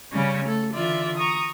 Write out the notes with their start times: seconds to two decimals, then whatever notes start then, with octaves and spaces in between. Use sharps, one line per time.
0.11 C#3 G3 C#4
0.45 A3 A4
0.73 D3 E3 F4 D5 E5
1.16 A#5 C#6 D#6